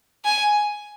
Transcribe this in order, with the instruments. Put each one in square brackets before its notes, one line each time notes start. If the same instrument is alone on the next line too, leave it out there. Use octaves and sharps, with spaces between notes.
[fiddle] G#5